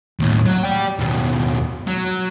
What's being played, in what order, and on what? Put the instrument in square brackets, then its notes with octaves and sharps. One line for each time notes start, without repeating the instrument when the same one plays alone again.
[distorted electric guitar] D#2 A2
F#3
D5 G5
D#2 B2
F#3